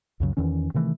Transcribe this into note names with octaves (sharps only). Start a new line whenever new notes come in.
C#2 F#2 C#3 F#3
E2 D#3 E3 C#4
C3 D#3 E3 A3